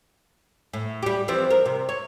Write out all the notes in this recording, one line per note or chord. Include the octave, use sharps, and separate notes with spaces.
A2
G3 G4
E3 F3 C4
A#4
C3
C#5